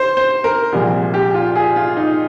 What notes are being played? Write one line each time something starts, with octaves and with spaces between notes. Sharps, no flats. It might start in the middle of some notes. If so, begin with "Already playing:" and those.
Already playing: C5
C5
A#4
C2 A#2 F3 G#3
G4
F4
G#4
F4
D#4